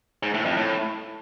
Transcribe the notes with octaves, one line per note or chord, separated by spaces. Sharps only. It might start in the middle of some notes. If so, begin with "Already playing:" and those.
G#2
A2
F2
A2